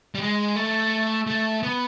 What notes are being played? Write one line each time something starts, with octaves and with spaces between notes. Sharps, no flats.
G3
G#3
A3
A3
B3